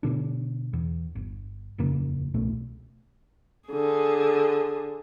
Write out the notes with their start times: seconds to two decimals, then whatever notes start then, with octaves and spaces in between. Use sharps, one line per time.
0.03 B2 D3 D4
0.73 E2
1.15 G1
1.78 D#1 F2 C#3 A#3
2.34 D1 C2 B2 A3
3.69 D3 G#4